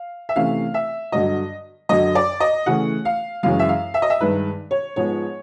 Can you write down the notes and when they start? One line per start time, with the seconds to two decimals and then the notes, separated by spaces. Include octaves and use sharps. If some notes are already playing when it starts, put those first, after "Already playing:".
Already playing: F5
0.29 E5
0.36 C3 E3 A3 C#4 F5
0.74 E5
1.12 G2 D3 F#3 D#5
1.89 F#2 D3 F#3 D#5
2.15 D5
2.40 D#5
2.66 C#3 E3 A3 C#4 F#5
3.05 F5
3.43 F#2 C#3 E3 G#3 C#4 F5
3.59 E5
3.69 F5
3.94 E5
4.02 D#5
4.10 E5
4.20 G2 D#3 G#3 B4
4.71 C#5
4.96 G#2 F3 G#3 B3 C#5